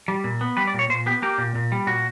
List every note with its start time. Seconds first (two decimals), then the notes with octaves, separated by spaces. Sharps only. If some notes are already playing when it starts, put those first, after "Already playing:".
0.08 G3
0.24 A#2
0.41 B3
0.57 G3 B4
0.67 D5
0.74 A#2
0.79 C#5
0.89 A#2 C5
1.06 B3 G4
1.22 A#3 G4
1.38 A#2
1.55 A#2
1.72 G3
1.87 A#2 F#4